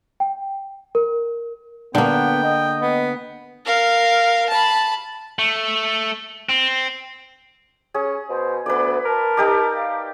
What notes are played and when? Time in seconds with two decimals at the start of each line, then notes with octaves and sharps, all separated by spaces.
0.20 G5
0.95 A#4
1.95 D3 A#3 B3 G5
2.43 D#5
2.81 B3
3.66 A#4 F5
4.49 A5 B5
5.39 A3
6.49 C4
7.94 C#4 G#4
8.29 B2 C5
8.66 D2 B3 B4 D5
9.05 A#4 A5
9.37 D#4 G4 D5
9.76 F5